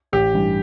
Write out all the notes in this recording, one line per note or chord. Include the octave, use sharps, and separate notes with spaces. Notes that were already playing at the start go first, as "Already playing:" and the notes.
A1 G4
G2 E3